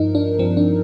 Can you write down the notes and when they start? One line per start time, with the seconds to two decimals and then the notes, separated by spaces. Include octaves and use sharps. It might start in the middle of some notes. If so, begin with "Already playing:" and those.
Already playing: G2 F3 D#4 A#4
0.15 D4
0.39 G2 F3 C4
0.57 D4